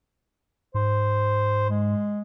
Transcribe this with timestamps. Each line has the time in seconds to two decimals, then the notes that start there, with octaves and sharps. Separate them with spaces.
0.74 G#2 C5
1.70 G#3